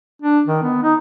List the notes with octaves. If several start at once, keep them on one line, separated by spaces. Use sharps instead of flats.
D4
D#3
B3
D#4